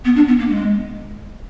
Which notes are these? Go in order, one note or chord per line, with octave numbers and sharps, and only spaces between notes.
B3
D4
B3
A#3
G#3